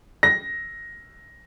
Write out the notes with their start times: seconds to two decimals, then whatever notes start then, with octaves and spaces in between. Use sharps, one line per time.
0.23 A#6